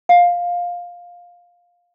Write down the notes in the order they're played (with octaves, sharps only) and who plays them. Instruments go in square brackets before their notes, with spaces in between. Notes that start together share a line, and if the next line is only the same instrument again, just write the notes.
[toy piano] F5